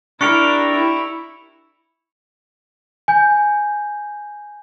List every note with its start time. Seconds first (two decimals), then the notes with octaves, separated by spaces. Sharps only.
0.21 D4 E4 G4 A#4 C#6 C#7 F7
0.73 E4
3.08 G#5 G6